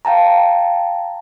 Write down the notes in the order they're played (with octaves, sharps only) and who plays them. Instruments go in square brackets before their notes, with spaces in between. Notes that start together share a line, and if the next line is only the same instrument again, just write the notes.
[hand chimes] F5 G5 A5 A#5